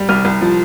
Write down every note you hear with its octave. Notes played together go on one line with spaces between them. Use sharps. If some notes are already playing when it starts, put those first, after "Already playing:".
Already playing: G3
C2 F6
C2
F3